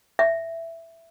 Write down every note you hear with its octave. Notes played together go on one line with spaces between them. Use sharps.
E5